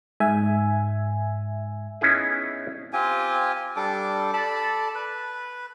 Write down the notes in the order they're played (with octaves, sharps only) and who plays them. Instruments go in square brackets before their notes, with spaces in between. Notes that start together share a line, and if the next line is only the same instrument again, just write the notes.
[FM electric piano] G#2 E5 G#5
[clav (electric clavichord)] B3 C#4 D#4 E4 G#4
[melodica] C4 F4 G4 G#5
G3 D4 A4 D6
A4 D5 A5 B5
B4